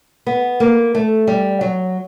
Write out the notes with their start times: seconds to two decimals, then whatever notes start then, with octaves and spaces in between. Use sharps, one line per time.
0.27 B3
0.60 A#3
0.95 A3
1.27 G3
1.61 F#3